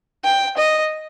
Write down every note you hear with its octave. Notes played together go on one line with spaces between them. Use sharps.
G5
D#5